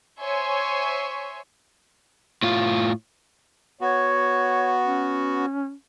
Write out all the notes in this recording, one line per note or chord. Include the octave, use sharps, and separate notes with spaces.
C5 C#5 E5 G#5 C6 C#6
A2 F4
B3 F#4 C#5
C#4